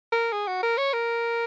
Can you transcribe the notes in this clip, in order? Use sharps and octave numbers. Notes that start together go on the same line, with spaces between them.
A#4
G#4
F#4
A#4
C#5
A#4